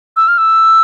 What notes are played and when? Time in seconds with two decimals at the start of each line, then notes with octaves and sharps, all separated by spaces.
0.17 E6
0.28 F6
0.38 E6